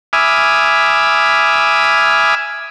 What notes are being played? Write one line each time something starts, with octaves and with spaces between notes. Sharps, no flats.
E5 G#5 B5 D6 D#6 F6